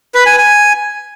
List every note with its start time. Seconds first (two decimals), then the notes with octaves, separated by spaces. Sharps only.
0.14 B4
0.26 G#5
0.38 G#5